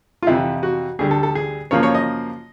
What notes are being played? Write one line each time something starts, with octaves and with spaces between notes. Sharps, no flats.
F4
F2 C3 E3 E4
F#4
D2 D3 G3 G#4
A4
A4
G#4
F#2 C#3 F3 A#3 C#5
C#5
D#5